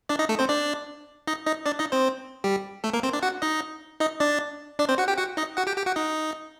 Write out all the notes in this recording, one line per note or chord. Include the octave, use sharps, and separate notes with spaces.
D4 D5
D#4 D#5
A3 A4
C4 C5
D4 D5
D#4 D#5
D#4 D#5
D4 D5
D#4 D#5
C4 C5
G3 G4
A3 A4
A#3 A#4
C4 C5
D4 D5
F#4 F#5
D#4 D#5
D#4 D#5
D4 D5
D4 D5
C4 C5
F#4 F#5
G4 G5
F#4 F#5
D#4 D#5
F#4 F#5
G4 G5
G4 G5
F#4 F#5
D#4 D#5